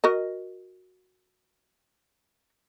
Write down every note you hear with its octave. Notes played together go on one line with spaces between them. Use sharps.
F#4 A#4 D#5